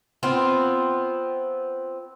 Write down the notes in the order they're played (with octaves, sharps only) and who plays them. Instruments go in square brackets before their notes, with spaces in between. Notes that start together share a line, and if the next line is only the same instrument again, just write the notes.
[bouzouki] B3 C4 F4